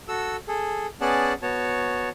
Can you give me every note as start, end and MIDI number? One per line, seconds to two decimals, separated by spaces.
0.08 0.37 66
0.08 0.37 69
0.08 0.37 88
0.48 0.87 68
0.48 0.87 69
1.01 1.33 59
1.01 1.33 61
1.01 1.33 68
1.01 1.33 74
1.01 1.33 78
1.01 1.33 81
1.42 2.09 59
1.42 2.09 66
1.42 2.09 73
1.42 2.09 81